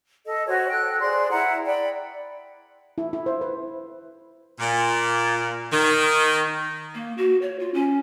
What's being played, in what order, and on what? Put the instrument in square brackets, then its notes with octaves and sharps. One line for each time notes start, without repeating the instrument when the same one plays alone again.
[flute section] A4 D#5
F#4 C5 C#5 G#5
A4 G5 F#6
G#4 C5 D5 C6
E4 F#5 A#5
D5 G5 B5
[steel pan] E4
E4
C5
B4
[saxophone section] A#2
D#3
[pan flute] A#3
F#4
C#5
F4
C#4